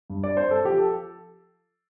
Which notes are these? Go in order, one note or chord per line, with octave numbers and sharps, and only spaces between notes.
G2
D5
C4 C5
A4
F3 G4
A4